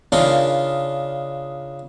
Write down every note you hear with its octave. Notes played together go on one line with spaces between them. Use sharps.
C#3 D4 D#4 F4 A#4